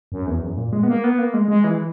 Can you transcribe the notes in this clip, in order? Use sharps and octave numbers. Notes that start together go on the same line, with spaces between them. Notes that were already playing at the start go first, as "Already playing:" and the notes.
F#2
E2
F#2
A#2
G#3
B3
A#3
B3
A#3
G#3
G#3
E3